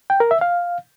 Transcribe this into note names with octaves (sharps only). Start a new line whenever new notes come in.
G5
A#4
E5
F5